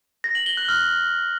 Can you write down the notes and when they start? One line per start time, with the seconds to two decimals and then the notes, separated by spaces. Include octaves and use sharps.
0.24 A#6
0.35 F#7
0.46 G7
0.57 F#6
0.68 F6